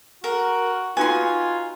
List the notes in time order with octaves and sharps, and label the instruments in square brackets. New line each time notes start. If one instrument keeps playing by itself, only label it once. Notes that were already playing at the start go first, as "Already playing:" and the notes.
[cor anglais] F#4 [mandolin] A#4
[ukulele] D#4 F#4 B4 [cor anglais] F4 [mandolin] G#5 C6